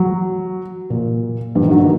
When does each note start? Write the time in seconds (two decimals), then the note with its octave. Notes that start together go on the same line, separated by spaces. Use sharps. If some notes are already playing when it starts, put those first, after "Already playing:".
Already playing: F#3
0.90 A#2
1.55 G2
1.63 D#3
1.71 F#3
1.79 D#3